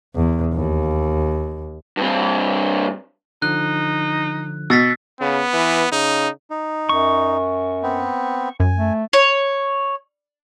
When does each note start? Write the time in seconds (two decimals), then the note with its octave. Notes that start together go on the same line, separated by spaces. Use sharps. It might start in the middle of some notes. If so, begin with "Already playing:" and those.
0.15 E2
0.54 D#2
1.97 G2 C4
3.42 D3 F3 D#4 F#6
4.70 B2 E6 A6 B6
5.21 C#3 B3
5.54 E3
5.92 C#3 D#4
6.50 D#4
6.89 F#2 C#6
7.83 B3 C4
8.60 F#2 G#5
8.77 A3
9.13 C#5